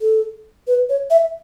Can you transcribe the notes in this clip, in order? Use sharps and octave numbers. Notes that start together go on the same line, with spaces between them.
A4
B4
C#5
E5